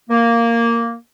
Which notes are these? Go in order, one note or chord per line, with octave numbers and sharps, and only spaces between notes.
A#3